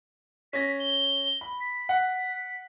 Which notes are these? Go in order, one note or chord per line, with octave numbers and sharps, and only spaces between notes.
C#4 A#6 B6
G7
B5
B6
F#5